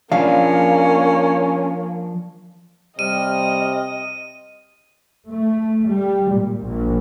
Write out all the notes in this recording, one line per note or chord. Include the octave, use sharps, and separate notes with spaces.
F3 A#3 C#4 D4 F5
C3 G3 D#5 F6 D#7
A3
G3
A#2
A#1